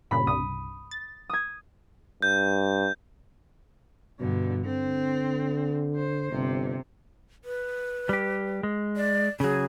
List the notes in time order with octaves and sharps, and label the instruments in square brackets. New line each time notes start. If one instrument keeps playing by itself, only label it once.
[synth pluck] G2 A#2 C#3 [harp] B5
[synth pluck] C2 G2 [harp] D#6
[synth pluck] A6
[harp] D#6 G#6
[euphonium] G2 [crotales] G6
[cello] G2 D3 [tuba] B2
[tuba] D3 [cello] C4
[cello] C5
[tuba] G1 [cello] C3
[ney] B4
[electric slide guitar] G3 G4
G#3
[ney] D5
[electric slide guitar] C#3 F#3 [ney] G#4